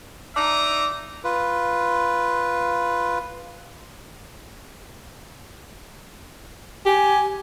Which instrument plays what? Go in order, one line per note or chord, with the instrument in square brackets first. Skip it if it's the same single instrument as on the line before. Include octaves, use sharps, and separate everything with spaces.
[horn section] D#4 D5 E5 A#5
[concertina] F4 B4
[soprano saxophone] G4 [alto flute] G#5